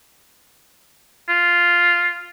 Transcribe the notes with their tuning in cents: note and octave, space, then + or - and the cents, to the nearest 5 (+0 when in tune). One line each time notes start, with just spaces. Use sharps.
F4 +0